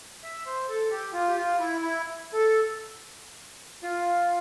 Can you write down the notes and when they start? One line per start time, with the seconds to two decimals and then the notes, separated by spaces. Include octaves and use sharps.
0.24 E5
0.46 C5
0.69 A4
0.91 G4
1.13 F4
1.28 G4
1.36 F4
1.59 E4
1.81 E4
2.33 A4
3.83 F4